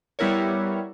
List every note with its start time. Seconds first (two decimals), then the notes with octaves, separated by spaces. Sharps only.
0.19 G3 B3 E4 A#4 C#5